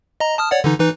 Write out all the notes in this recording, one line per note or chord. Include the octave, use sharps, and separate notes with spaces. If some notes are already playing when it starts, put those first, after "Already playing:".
D#5 A#5
A5 D#6 F6
C#5 D5 F#5
D3 E3 D#4
E3 D#4 B4